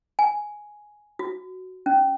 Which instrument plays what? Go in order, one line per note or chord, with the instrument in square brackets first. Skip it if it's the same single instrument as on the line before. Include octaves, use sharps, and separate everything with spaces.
[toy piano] G#5
F#4
C#4